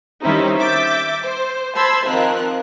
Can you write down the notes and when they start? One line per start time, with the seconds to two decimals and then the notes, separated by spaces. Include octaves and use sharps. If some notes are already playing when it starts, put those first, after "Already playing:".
0.22 D#3 G3 C4 C#4 D#4 E4
0.59 E5 D6 E6 G6 A6
1.24 C5
1.75 C5 A5 B5 C6 E6 G#6
2.05 D#3 F3 C4 A#4 F#6